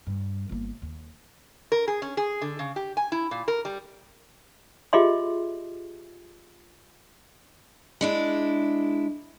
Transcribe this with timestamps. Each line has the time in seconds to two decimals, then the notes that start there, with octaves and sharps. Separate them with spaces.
0.07 G2 G3
0.49 G1 A#3
0.82 D#2
1.72 A#4
1.88 G#4
2.02 C#4
2.17 G#4
2.42 D3
2.59 C#3
2.76 G4
2.97 G#5
3.12 E4
3.31 A#2
3.48 A#4
3.65 G3
4.93 F4 G4 G#4 D#5 E5 C6
8.01 G#3 D4 E4